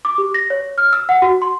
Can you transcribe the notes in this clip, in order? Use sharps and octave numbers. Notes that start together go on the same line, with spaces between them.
D6
G4
A#6
C#5
F6
E6
F#5
F#4
C6